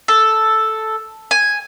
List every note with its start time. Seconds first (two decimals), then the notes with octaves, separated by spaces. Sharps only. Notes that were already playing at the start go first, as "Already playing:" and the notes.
0.08 A4
1.31 G#5